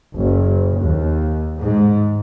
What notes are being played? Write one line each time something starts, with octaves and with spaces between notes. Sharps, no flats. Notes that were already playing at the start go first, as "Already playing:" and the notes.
F#1
D#2
G#2